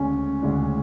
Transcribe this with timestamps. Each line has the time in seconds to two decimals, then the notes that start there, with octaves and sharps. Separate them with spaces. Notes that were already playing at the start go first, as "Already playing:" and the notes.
Already playing: D2 C#3 G#3 C#4 D4
0.42 D2 C#3 G#3 D4